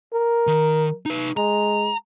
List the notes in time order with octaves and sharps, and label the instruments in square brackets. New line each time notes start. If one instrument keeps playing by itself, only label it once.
[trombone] A#4
[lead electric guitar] D#3
D#4 B4
[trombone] G#3 [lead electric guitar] A#5